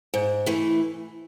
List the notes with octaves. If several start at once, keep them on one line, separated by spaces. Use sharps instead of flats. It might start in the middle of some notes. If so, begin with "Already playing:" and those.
G#2
E3 A3